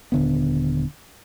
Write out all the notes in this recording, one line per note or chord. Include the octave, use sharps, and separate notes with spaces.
D#1 D3 B3